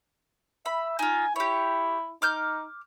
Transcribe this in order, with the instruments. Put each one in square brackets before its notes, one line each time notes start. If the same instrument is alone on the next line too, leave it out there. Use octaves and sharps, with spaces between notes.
[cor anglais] E5 [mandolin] B5
[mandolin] D#4 F4 [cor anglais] G#5
[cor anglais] E4 [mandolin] G4 C#5
[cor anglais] D#4 [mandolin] D6 F6 G6